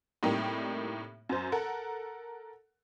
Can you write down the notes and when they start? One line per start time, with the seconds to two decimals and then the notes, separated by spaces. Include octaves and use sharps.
0.23 A2 C3 G3 A#3 D#4 G4
1.29 F#2 C5
1.52 A4 A#4 F#5